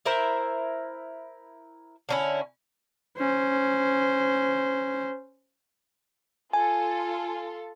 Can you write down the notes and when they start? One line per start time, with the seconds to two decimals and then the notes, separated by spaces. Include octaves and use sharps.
0.05 E4 A#4 C5 E5
2.09 D3 C#4 E4
3.18 C#4 C5
6.53 F4 A4 G#5